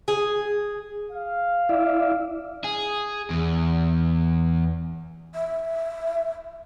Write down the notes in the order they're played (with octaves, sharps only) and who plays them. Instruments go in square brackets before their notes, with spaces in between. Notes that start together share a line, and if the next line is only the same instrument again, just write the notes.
[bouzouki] G#4
[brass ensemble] F5
[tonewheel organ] E4 D5 E5
[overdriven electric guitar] G#4
E2
[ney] E5